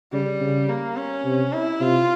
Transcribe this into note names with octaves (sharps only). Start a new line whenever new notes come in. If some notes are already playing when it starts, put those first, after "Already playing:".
C#3 G3
C#3
A#3
C#4
C3
E4
C3 F4